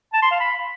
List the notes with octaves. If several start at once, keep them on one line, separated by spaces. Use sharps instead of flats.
A5
C6
F5
B5